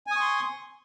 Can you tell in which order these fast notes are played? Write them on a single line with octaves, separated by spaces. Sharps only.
G#5 D#6 C#6 C6